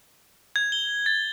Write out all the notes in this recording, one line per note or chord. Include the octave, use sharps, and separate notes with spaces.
G#6
G7
A6